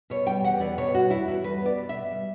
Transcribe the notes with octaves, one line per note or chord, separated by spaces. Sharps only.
B2 C#5
G3 G5
E2 F#5
E2 D5
B2 C#5
G3 F#4
E2 E4
E2 F#4
G3 B4
B3 D5
B2
B2 E5
G3